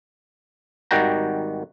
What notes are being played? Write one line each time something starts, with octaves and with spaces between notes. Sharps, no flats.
G#1 D#3 G3 F#4 G5 A#5